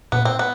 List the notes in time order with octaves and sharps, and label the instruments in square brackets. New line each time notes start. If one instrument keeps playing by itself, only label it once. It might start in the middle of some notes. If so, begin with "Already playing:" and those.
[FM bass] A#2 [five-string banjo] B3
[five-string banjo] C4
B3